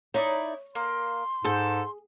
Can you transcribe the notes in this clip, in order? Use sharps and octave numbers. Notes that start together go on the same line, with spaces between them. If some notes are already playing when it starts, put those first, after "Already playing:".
D#4 E4 C#5 D5
A#3 C6
G#2 G#4 A4 G6